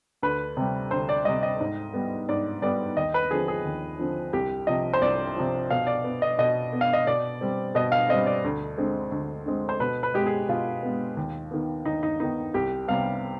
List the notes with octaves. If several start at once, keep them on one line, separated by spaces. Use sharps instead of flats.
D2 B4
C3 G3
D2 C5
D5
C3 G3 D#5
D#5
G#2
G3 B3
G#2 D5
G3 B3 D5
D#2 D#5
B4
D3 F3 C4 G#4
G#4
D#2
D3 F3 C4
C2 G4
C3 F3 D#5
C5
C2 D5
C3 F3
B2 F5
D5
B3
D#5
B2 D#5
B3
F5
D#5
B2 D5
G3 C4
B2 D#5
F5
G3 C4 D#5
D5
D2
D3 G#3 C4
D2
D3 G#3 C4
C5
B2 B4
B4
G#3 B3 G4
G#4
B2 F4
G#3 B3
D#2
D#3 B3
D#2 D#4
D#4
D#3 B3 D#4
C2 G4
C3 G3 B3 F5